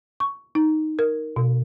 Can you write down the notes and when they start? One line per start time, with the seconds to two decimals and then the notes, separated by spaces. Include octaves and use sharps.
0.20 C#6
0.55 D#4
0.99 A#4
1.36 B2